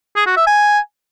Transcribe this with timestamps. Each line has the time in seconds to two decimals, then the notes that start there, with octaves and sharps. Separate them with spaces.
0.16 G#4
0.26 F#4
0.37 E5
0.47 G#5